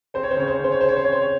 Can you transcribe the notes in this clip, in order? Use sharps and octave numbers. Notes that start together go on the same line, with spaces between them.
C4 C5
C#5
C5
C#3 C#5
C5
C#5
C#3 C5
C#5
C4 C5
C#5
C5
C4 C#5
C5
C#5